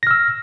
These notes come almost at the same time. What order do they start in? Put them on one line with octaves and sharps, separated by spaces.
A#6 F6 E6